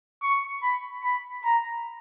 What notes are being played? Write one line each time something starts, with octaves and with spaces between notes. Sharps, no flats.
C#6
B5
B5
A#5